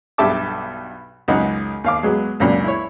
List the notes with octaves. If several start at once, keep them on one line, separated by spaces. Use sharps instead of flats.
B1 G2 G4 E5 A5 D6
C#2 F#2 D#4 F#5
D#2 F5 D6
F#3 G#3 B3
C#2 F#2 A#2 D4
E4 C#5